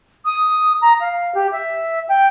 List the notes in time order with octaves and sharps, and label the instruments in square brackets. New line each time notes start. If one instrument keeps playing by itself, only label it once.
[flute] D#6
A#5
F5
G4
E5
G5